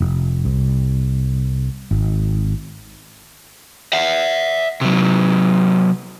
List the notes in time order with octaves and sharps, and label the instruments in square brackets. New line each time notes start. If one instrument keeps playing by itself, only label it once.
[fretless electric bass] F1
C2
G#1
[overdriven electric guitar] E5 F#5
C3 F#3